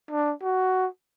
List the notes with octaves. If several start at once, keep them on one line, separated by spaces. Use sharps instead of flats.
D4
F#4